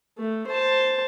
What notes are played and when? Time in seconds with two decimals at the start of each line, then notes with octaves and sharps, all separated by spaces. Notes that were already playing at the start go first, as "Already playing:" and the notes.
0.18 A3
0.47 C5 A5